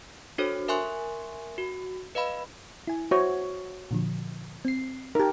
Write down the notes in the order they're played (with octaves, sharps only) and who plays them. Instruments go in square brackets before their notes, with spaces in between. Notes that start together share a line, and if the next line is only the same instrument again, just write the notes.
[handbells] D4 F#4 A4 C5 C#5
A#4 E5 G#5 C6 C#6 F#6
F#4
B4 D#5 F5 B5
[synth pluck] E4 G#5
[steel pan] F#4 C#5 [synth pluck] C5 E5
[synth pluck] A#2 D3 F3
C4 C7
[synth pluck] D#4 A5 [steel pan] G4 A#4